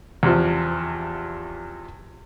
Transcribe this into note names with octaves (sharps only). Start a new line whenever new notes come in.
E2 C3 F3